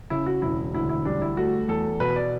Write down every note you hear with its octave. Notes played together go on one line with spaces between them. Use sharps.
C#3 E4
F#4
E1 E4
D2 E4
E4
G3 D4
E4
A3 F#4
E2 A4
B2 B4
D5